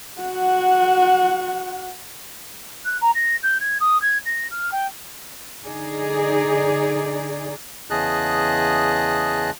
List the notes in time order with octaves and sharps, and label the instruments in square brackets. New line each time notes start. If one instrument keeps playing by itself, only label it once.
[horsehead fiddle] F#4 F#5
[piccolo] F#6
A#5
A#6
G6
G#6
D#6
G#6
A#6
F6
G5
[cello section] D3 D#4 G#4 D5
[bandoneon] E2 C#3 G#4 D#5 A5 F#6